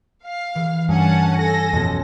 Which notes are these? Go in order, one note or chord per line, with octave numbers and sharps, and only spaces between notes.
F5
E3
G2 A#3 C#4 F#5 G#5 A5
A4 G#5 A#6
A1 F2 B2